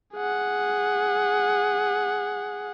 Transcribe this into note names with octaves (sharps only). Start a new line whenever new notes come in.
G#4 F#5